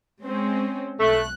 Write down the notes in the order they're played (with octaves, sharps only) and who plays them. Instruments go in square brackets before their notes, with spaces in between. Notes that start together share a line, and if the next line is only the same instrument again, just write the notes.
[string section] G#3 C4 C#4
[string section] B1 F#6 [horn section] A3